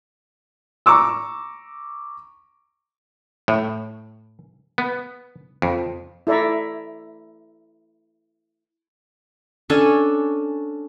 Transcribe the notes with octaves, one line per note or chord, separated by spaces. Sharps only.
A#5 C#6 D6 E6
A2
B3
F2
E4 A4 D5 E5 A#5
C#4 D4 A4 G#5